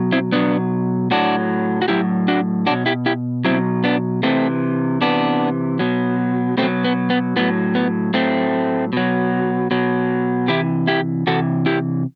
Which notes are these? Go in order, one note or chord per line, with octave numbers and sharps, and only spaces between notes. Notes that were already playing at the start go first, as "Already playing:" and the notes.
Already playing: B2 F#3
C4 E4
B2 F#3 B3 D4
A2 F#3 D4 F#4
F#4
A2 F#3 E4 G4
D4 F#4
B2 F#3 D4 F#4
E4 G4
E4 G4
B2 F#3 C4 E4
B3 D4
C3 E3 A3 C4
C3 E3 B3 D4
B2 F#3
B2 A3 C4
F#3
B3
B3
A2 F#3 B3
B3
A2 F#3 A3 C4
B2 F#3
B2 F#3
C3 E3 E4 G4
E4 G4
C3 E3 F#4 A4
E4 G4